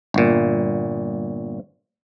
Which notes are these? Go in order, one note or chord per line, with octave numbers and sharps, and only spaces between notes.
G1 A#2